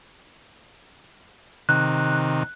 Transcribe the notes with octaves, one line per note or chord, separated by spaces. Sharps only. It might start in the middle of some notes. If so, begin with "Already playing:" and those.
C3 D#3 F#6